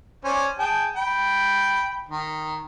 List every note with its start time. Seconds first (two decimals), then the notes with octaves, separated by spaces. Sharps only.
0.25 C#4 C5 D5
0.59 G#4 G5 A5
0.96 G5 B5
2.09 D#3